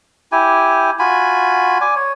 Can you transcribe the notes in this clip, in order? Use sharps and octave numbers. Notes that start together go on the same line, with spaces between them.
E4 G4 G#5
F4 F#4 G#5 B5
D5 G#5
C#5